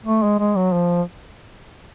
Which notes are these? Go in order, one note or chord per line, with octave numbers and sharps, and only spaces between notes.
A3
G#3
G#3
F#3
F3